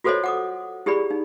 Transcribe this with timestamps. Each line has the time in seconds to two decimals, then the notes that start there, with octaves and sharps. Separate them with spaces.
0.04 F4 F#4 A4 C5 C#5 D#5
0.24 F#5 D6 D#6
0.86 E4 G4 G#4 D5 B5
1.11 D#4